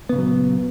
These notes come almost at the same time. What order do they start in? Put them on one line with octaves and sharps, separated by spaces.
B3 C#3 A#2 F#3